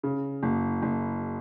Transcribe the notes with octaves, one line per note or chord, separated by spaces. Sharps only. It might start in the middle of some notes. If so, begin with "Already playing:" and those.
C#3
F#1
F#1